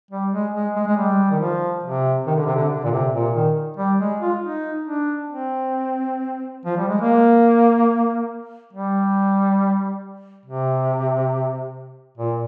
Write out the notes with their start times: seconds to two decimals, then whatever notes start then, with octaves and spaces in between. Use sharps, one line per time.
0.11 G3
0.33 G#3
0.54 G#3
0.76 G#3
0.87 G#3
0.97 G3
1.31 D#3
1.40 F3
1.83 C3
2.27 D#3
2.36 D3
2.45 C3
2.55 D3
2.70 D3
2.84 A#2
2.91 C3
3.13 A#2
3.34 D#3
3.77 G3
3.99 G#3
4.20 F4
4.42 D#4
4.85 D4
5.28 C4
6.65 F3
6.77 G3
6.88 G#3
7.01 A#3
8.73 G3
10.46 C3
12.17 A#2